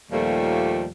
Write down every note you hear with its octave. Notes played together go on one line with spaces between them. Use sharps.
D#2 A#2 F3 G3 A3